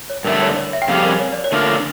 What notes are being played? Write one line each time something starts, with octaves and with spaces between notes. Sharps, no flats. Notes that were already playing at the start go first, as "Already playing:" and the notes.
C#5
G2 D3 A3 E4 A#4
C#5
D5
C#5
E5
G5
F2 C#3 G3 C#4 F5
A#4
C#5
D5
C#5
D3 A3 D4 F4 A#4